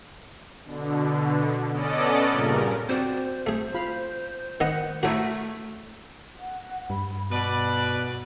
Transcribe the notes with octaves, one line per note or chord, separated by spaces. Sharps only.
B2 D3
B3 C#4 A4 D5 D#5
G2 A#2 C#3 A#4
C4 F#4 C5 D5
A3 G#4
F4 F5 B5
D#3 B3 D#5 F#5
A3 E4 F#4 A4 A#4 C#5
F#5
G2 B5
B2 B4 D5 B5